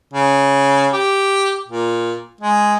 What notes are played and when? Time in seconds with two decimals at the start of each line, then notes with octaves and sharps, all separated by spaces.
0.13 C#3
0.93 G4
1.68 A#2
2.41 G#3